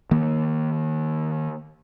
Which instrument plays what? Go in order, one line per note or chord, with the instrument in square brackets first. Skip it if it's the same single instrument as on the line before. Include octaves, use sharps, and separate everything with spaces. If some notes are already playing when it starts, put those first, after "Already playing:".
[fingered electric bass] D#3 A#3